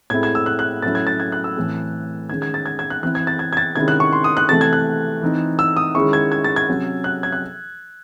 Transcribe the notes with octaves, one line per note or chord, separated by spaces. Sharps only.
A2 G#3 C4 E4 G#6
G#6
E6
F#6
F#6
A2 F#3 C#4 E4 A6
G#6
A6
G#6
F#6
E6
A2 E3 A3 C4
D#3 G#3 C#4 G#6
G#6
A6
G#6
G#6
F#6
E3 C4 E4 F#6
G#6
A6
G#6
G#6
A6
C3 D#3 G#3 C#4 E4 G#6
F#6
C#6
C6
D#6
F#6
C3 E3 A3 C4 A6
G#6
F#6
E3 C4 D#4
E6
D#6
D#3 G#3 C#4 E4 C#6
G#6
G#6
A6
G#6
C3 F#3 C#4
F#6
G#6
F#6